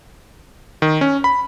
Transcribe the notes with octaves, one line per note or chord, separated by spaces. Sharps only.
D#3
C#4
B5